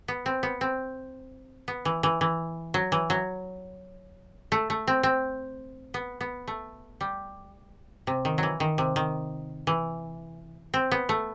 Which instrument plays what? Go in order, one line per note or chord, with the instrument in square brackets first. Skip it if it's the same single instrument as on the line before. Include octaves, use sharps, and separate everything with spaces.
[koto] B3
C4
B3
C4
B3
E3
E3
E3
F#3
E3
F#3
A3
A3
C4
C4
B3
B3
A3
G3
C3
D#3
E3 F#3
D#3
C3
D#3
E3
C4
B3
A3